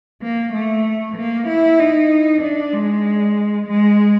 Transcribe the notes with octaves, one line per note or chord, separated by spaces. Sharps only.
A#3
A3
A#3
E4
D#4
D4
G#3
G#3